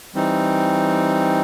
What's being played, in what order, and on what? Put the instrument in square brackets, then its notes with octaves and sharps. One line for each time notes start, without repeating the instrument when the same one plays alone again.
[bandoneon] E3 G3 C4 D#4